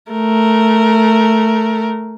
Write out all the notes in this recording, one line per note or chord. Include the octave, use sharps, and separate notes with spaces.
A3 A#4